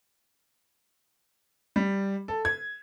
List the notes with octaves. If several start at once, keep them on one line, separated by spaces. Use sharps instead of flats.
G3
A4
G#6